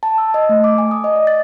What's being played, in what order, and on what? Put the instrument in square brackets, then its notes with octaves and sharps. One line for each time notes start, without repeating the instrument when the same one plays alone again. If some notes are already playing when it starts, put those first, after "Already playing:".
[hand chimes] A5
E6
D#5
A3
D6
G#5
D#6
D#5
D5
A6